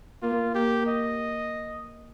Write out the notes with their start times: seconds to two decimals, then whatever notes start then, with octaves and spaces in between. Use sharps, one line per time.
0.22 A#3 F4
0.55 A#3 G4
0.87 D#5